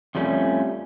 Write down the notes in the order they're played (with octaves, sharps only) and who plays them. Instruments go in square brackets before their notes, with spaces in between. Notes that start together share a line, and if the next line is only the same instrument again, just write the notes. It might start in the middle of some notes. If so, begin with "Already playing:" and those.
[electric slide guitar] F2 F3 G3 A3 C#4